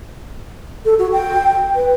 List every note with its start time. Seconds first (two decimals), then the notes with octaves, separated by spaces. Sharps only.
0.85 A4
0.99 F#4
1.12 G5
1.75 B4